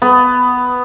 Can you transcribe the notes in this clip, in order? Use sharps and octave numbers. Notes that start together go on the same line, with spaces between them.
B3